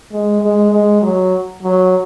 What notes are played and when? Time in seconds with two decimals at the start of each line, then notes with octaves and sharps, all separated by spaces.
0.12 G#3
0.42 G#3
0.72 G#3
1.02 F#3
1.63 F#3